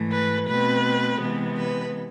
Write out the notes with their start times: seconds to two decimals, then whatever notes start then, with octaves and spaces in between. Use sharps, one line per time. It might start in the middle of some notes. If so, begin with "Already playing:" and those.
Already playing: G#2 E3 A3
0.12 B4
0.47 B2 A3 C4 B4
1.21 C3 E3 G#3 B3
1.58 B4